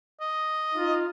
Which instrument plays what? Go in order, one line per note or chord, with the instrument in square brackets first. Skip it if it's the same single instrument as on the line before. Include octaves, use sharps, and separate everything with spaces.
[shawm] D#5
[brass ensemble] D#4 F4